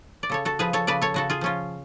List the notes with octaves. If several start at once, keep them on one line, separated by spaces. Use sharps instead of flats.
D5
C#3 A4 C#5
F#4 A4
F3 G#4 B4
A4 C#5
C#3 B4 D5
A4 C#5
C#3 F#4 A4
F4 G#4
F3 C#4 F4